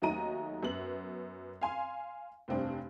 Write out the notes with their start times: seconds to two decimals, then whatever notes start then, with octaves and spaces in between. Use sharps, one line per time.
0.02 D#2 F#3 A3 D#4 A#5 D#7
0.63 F#2 B3 F#7
1.61 F5 G#5 C6
2.48 F1 G2 C4 D4